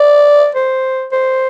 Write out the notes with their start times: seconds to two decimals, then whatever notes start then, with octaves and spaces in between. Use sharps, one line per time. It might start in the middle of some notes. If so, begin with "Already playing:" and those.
Already playing: D5
0.55 C5
1.12 C5